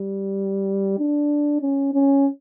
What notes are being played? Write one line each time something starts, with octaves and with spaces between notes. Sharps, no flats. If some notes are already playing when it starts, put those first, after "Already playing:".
Already playing: G3
D4
C#4
C#4